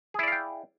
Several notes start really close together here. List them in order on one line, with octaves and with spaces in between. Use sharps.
G#4 E4 D5 F5 G5